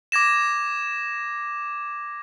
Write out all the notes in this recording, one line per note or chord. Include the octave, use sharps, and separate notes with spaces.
D6 G#6 A#6 E7